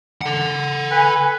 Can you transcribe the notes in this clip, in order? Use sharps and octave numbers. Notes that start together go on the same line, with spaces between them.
A4 F#5
B4 G#5